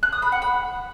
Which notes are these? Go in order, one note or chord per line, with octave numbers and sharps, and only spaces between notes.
F#6
D#6
B5
F#5
B5